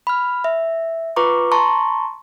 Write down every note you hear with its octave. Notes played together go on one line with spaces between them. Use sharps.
B5 F6
E5
F4 B4 A#5 C#6 D6
A5 A#5 C6 C#6